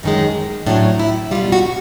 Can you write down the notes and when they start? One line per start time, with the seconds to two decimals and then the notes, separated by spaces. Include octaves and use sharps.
0.03 F#2 D#3 G#3 D#4
0.66 A2 F#3 D4
0.99 E4
1.31 G3 F4
1.35 B2
1.52 F#4